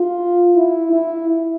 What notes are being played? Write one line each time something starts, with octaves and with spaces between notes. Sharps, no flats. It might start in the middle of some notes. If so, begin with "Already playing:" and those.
Already playing: F4
E4
E4